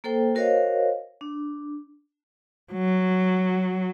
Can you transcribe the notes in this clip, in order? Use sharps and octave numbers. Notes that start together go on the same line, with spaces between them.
A#3 A4 C5 G5
F#4 A#4 C5 C#5 D#5 F5
D4
F#3